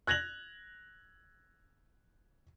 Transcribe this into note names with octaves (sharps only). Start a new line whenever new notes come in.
F#6 G#6 A#6 F7 F#7